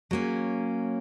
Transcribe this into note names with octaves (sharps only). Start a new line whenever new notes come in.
F#3 A#3 C#4